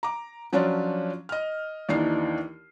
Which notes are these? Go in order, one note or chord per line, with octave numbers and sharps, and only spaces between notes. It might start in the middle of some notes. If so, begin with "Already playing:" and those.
A#5 D6
F3 F#3 C#4 D4 F4 D5
D#5 F6
D#2 E3 D4 D#4 C7